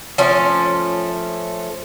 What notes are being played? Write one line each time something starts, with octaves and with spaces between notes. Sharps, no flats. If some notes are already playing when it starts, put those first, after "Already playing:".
F3 A3 C#4